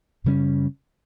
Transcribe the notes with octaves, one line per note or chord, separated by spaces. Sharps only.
F#2 C#3 G3 C#4